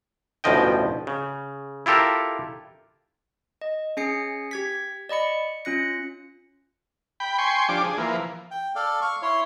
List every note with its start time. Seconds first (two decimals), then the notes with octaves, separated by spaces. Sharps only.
0.44 A1 D2 B2 F3 D#5 G5
1.07 C#3
1.86 E4 F4 G4 A4 A#4
3.61 D#5
3.97 C#4 G#4 G#5 C7 C#7
4.51 G4 G#6 B6
5.09 D5 D#5 B5 C#7
5.65 C#4 F4 F#6 A#6 C#7
7.20 G5 B5
7.38 G5 G#5 C6 C#6
7.69 F3 D4 G4 D6
7.84 G#4
7.98 E3 F3 A#3
8.51 G5
8.76 A4 D5 F5
9.01 F5 C#6
9.22 E4 C#5 C6